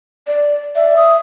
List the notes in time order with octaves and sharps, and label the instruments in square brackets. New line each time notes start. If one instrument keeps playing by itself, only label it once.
[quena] D5
[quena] D5 [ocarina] E5
[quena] D#6